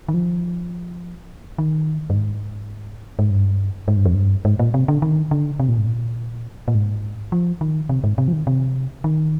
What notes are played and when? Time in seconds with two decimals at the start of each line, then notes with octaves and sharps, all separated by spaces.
0.08 D#3
0.14 F3
1.58 D#3
2.10 G2
2.15 G#2
3.19 G#2
3.30 G2
3.88 G#2
3.97 G2
4.06 F2
4.15 G2
4.45 G#2
4.59 A#2
4.74 C3
4.88 D3
5.02 D#3
5.31 D3
5.60 C3
5.69 A#2
5.78 G#2
5.86 A#2
6.68 A#2
6.75 G#2
7.32 F3
7.61 D#3
7.89 C3
8.04 G#2
8.18 C3
8.28 F3
8.33 D#3
8.47 C3
9.04 D#3